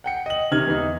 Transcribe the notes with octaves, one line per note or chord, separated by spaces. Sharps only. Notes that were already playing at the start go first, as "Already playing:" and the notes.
F#5 G5 C#7
D#5 F#7
C3 D#3 F6 G#6 F#7
E2 D#4